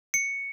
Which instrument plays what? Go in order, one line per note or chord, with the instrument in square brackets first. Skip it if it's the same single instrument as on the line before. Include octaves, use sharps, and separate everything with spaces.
[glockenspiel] C#7